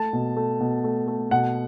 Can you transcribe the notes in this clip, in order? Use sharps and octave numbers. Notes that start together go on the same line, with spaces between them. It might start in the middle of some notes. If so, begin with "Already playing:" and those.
Already playing: A3 A5
B2
A3
B2
A3
A3
B2 F#5